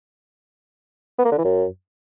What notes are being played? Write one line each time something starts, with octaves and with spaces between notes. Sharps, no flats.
B3
A#3
D3
E3
F#2